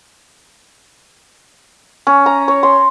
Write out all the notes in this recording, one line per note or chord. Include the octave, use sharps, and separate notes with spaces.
C#4
A#5
C#5
C6